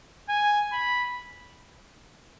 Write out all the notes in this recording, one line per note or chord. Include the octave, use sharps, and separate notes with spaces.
G#5
B5